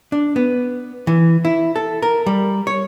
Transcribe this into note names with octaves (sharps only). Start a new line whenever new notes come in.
D4
B3
E3
E4
A4
A#4
G3
C#5